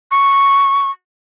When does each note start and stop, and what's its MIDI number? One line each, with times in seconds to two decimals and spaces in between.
0.11 0.91 85